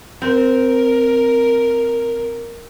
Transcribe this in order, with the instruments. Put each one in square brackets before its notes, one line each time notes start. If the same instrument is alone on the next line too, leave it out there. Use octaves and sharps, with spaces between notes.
[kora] C4 [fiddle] A#4